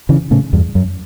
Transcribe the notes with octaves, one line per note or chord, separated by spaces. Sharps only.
C#3 E3
A2 C#3
E2 G2
F#2